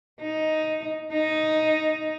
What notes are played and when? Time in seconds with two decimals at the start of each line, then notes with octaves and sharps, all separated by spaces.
0.21 D#4
1.12 D#4